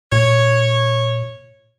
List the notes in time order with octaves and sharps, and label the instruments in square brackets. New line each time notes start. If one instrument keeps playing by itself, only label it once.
[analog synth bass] A#2 [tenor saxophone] C#5